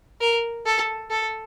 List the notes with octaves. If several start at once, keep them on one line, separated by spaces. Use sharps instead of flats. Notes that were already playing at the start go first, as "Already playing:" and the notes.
A#4
A4
A4